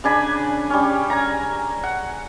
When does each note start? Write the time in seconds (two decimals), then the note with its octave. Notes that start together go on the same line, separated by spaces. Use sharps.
0.04 C#3 D4 G#5 B5
0.70 G3 C#4
1.10 G#5 A#5
1.84 F#5